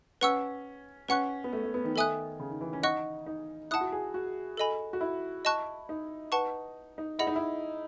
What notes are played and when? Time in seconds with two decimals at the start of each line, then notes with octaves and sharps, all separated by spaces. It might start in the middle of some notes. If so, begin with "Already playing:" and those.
0.21 C#4 B4 F#5 C#6 E6
1.08 C#4 B4 F#5 C#6 F#6
1.44 B3
1.53 A3
1.63 A3
1.74 B3
1.85 D#3
1.96 D#3 A4 E5 G#5 D#6 F#6
2.40 C#3
2.50 D#3
2.61 E3
2.73 C#4
2.83 D#4 D#5 F#5 C#6 F#6
3.26 D#4
3.71 E4 F#5 A5 D#6 F#6
3.81 F#4
3.92 G#4
4.14 F#4
4.57 A4 D#5 G#5 B5
4.93 F#4
5.01 E4
5.45 D#5 A5 C#6 F#6
5.89 D#4
6.32 B4 F#5 A5 C#6
6.98 D#4
7.19 E4 G#4 D#5 F#5 B5
7.27 D#4
7.36 E4